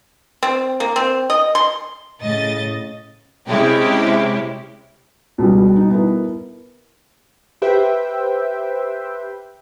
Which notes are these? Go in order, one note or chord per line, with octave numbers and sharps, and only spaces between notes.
C4
A#3
C4
D#5
C6
A2 C#3 D#5 A6
C3 G#3 C#4 E4 G4
C#2 B2 G3
D#4
B3 E4 A#4
G4 B4 C5 E5 G5